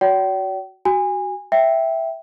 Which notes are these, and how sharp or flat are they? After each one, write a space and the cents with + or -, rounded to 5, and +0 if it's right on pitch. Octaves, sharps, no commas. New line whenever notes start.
F#4 +5 D5 -45 G5 -40
F#4 +20 G#5 -25
E5 +0 G5 +0